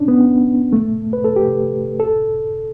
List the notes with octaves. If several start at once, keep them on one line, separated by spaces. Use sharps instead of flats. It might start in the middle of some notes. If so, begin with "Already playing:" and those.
Already playing: C#4 D4
B3
A3
B4
A4
G4
A4